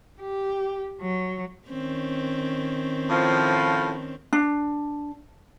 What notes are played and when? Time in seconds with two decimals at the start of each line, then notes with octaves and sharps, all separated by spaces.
0.21 G4
1.01 F#3
1.68 D#3 C4 C#4
3.10 A2 F3
4.33 D4